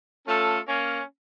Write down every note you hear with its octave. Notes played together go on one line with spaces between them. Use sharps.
A3 C#4 F4 A4
A#3 C#4